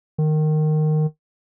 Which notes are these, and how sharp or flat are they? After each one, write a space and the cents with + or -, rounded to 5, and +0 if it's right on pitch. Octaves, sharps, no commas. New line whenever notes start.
D#3 -15